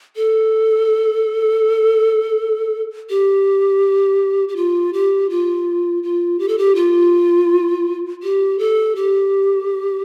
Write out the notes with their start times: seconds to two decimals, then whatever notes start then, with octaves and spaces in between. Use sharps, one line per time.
0.16 A4
3.10 G4
4.48 G4
4.56 F4
4.93 G4
5.30 F4
6.03 F4
6.39 G4
6.48 A4
6.58 G4
6.75 F4
8.23 G4
8.59 A4
8.96 G4